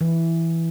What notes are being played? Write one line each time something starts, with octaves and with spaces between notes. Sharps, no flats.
E3